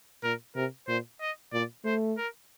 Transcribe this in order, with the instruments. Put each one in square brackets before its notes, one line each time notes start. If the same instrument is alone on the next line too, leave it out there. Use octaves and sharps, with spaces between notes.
[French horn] A#2 [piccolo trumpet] A#4
[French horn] C3 [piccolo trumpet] A#4
[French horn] A#2 [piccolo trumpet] C5
[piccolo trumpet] D#5
[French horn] A#2 [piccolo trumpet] D5
[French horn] A3 [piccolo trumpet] C5
[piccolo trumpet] A#4